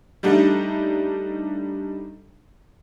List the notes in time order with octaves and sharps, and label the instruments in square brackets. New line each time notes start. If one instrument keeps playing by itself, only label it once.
[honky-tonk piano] G3 A3 D4 D#4